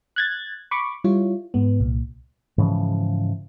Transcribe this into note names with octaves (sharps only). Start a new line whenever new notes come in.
F#6 G#6 A6
B5 C#6 D6
G3 E4 F4 C#5
G#2 B3
C2 A#2
G#2 C#3 E3 F3